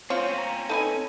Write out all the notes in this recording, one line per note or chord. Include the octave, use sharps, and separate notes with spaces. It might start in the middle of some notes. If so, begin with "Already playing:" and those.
C4 C#4 F4 C5 C#5 G5
A#5
D#4 A4 B4 G#5